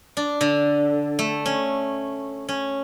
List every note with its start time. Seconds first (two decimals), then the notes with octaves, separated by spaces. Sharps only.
0.17 D4
0.41 D3
1.19 A3
1.46 C#4
2.49 C#4